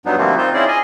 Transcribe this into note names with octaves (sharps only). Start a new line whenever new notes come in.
G2 F#3 B3 D4 D#4
D3 F3 G3 A3 A#3 C4
C4 D#4 F4 C5
C4 C#4 E4 F4 G#4 D5
G#4 D#5 G#5